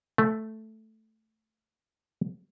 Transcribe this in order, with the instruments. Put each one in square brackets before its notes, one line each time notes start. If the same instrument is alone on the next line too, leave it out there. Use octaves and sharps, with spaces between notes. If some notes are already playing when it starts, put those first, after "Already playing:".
[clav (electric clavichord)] A3